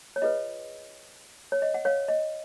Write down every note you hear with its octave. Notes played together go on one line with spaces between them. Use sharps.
C#5
F4 G#4 B4 D#5
C#5
D#5
F#5
C#5 F5
D#5